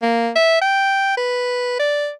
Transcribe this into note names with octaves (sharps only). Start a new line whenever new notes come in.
A#3
E5
G5
B4
D5